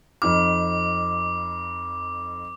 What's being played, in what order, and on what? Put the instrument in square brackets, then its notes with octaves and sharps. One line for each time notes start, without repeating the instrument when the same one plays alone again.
[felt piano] F2 D#4 F6 [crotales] D6